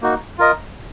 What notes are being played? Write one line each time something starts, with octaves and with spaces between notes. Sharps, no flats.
A#3 D#4 F#4
F4 A#4 D#5